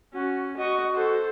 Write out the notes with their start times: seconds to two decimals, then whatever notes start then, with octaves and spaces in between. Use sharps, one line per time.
0.13 C#4 F#4
0.57 F#4 D#5 C#6
0.94 A4 C5